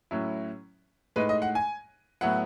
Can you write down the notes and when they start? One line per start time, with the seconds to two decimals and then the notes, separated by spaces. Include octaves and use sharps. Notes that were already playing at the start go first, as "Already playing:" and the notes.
0.11 A2 F#3 C#4 E4
1.16 A2 G#3 D#4 B4
1.29 D#5
1.42 F#5
1.55 G#5
2.21 A2 F#3 B3 E4 F#5